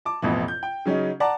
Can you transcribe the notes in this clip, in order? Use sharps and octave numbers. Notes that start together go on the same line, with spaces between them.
A5 D6
A1 F2 B2 E3
G6
G5
C#3 F#3 C#4 D#4
D5 F#5 A5 A#5 D6